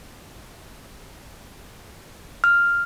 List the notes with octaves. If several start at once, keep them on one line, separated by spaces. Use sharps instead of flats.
F6